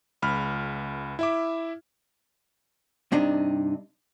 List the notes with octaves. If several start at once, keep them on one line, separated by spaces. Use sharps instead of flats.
C#2 B5 F6
E4 E5 D6
G2 C3 D4 D#4